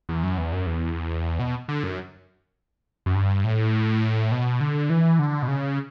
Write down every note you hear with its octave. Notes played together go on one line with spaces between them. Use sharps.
E2
F#2
E2
F#2
E2
B2
D3
F#2
F#2
G2
A2
B2
D3
E3
D3
B2
C#3